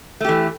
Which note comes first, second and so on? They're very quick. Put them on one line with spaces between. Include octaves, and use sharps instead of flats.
A3 G4 E3